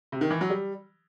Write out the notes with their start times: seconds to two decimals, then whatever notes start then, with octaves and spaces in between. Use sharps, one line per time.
0.12 C3
0.21 D#3
0.31 E3
0.41 F#3
0.50 G3